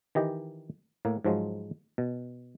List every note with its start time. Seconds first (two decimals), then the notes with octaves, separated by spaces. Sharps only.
0.15 D#3 E3 G4 D#5
1.05 A2 A#3
1.25 G#2 F3 F#3 G#3
1.98 B2